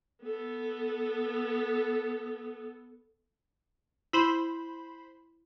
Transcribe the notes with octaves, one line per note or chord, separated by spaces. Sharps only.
B3 A4
E4 C5 B5